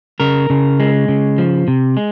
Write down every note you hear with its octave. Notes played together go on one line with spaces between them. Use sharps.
C#3 A#4
C#3
G#3
C#3
F3
C3
G#3